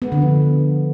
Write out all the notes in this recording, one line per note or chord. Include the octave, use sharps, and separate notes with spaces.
B3
D3
F3